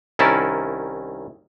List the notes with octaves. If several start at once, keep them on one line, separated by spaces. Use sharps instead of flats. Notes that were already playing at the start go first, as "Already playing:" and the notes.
C2 D#3 C#4 E4 A#4 A5